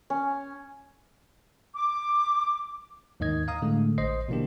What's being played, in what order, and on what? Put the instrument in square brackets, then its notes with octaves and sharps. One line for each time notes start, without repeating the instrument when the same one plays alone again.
[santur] C#4
[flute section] D6
[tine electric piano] D#2 G#2 D#3 D#5 G#6
F5 A#5 D#6
A2 D3 G#3 A3
A1 C5 D#5 C7
B2 D3 E3 A#3 D4 G4